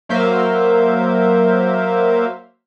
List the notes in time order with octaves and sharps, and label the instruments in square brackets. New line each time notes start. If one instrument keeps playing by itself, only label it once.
[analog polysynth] F#3 A#3 C5 E5 F5